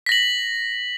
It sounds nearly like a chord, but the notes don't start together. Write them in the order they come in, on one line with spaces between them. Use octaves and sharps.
B6 A#6 F#7